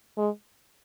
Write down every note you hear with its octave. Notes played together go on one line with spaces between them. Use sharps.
G#3